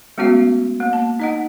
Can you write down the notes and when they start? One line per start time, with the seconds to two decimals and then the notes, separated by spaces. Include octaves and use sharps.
0.18 G#3 A3 B3 C#4 F#4 F5
0.80 A#3
0.93 A5
1.20 D#4 D#5 F#5